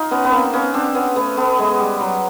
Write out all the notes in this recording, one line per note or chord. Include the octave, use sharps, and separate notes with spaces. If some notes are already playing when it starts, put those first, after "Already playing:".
Already playing: D#4 F4
B3 C#4
B3
A#3 C4
B3 C#4
C4 D4
B3 C#4
A3 B3
A3 B3
G#3
G3
F#3